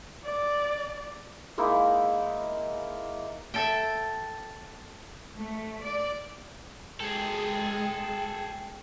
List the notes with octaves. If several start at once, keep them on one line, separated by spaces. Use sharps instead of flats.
D5
G#3 A#3 D#4 E4
A4 E5 G5
A3
D5
G#3 G#4 A4 G5